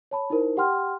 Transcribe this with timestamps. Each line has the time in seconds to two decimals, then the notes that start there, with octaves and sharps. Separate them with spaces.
0.11 C#5 A5 B5
0.30 D#4 E4 A#4 C5
0.57 G4 F#5 G5 C6 F6